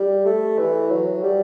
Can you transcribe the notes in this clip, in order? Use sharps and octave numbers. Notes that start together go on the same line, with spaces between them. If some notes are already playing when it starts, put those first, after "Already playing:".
Already playing: G3
A3
E3
F#3
G3